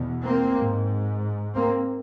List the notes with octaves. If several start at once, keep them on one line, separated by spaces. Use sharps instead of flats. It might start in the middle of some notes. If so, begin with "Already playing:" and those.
Already playing: E2 B2
A#3 C4
G#2
A#3 C4